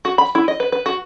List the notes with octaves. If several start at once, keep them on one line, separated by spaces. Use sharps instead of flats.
F#4
B5
E4
D#5
B4
B4
F#4